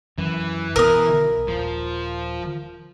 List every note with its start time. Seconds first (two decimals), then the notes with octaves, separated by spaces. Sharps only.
0.18 F#2 E3
0.76 B1 B2 B3 A#4 D#6
1.48 D#1 F3